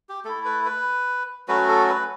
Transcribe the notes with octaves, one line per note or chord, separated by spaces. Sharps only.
G4
A3 E4 A4
B4
B4
F#3 A3 C#4 F#4 B4
A4
B4